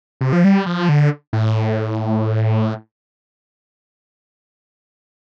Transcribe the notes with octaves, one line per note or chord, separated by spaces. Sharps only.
C3
F3
G3
F3
D3
A2